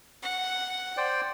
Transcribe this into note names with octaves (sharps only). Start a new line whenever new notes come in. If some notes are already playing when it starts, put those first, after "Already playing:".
F#5
C5 D5 G5